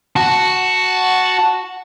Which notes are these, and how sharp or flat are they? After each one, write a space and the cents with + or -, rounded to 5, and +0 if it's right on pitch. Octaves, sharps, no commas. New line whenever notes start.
F#4 +0 A5 +0